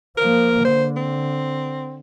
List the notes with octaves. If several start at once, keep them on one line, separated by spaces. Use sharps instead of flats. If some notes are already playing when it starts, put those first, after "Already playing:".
F3 A#3 A#4
D3 C5
C4